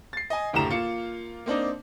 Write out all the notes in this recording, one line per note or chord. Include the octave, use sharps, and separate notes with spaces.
A6 C7
D#5 G#5
F#1 D2 A2 G4 A#5 E7
A#3 F4 C#7
A#3 C4 D4 D#4